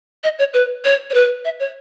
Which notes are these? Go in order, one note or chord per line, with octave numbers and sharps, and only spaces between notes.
D#5
C#5
B4
C#5
C#5
B4
E5
C#5